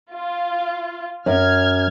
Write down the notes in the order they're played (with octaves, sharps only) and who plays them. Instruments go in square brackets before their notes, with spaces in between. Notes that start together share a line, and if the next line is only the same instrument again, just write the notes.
[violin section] F4
[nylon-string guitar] F#2 [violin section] F6 G#6